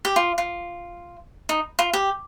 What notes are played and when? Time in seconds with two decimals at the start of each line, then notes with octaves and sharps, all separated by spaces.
0.05 G4
0.16 F4
0.38 F4
1.49 D#4
1.79 F4
1.93 G4